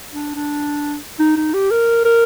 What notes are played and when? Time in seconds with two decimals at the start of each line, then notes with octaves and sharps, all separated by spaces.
0.12 D4
0.35 D4
1.19 D#4
1.37 D#4
1.54 G4
1.71 A#4
2.05 A#4